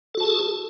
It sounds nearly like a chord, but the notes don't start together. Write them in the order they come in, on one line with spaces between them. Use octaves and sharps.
A4 F#4 A5 G#4